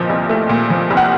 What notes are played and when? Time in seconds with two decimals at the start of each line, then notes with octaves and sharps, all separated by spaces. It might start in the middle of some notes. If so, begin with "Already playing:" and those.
Already playing: A#2 F3 D#5
0.09 C2
0.29 A3
0.49 A#2
0.70 F3
0.90 C2
0.97 F#5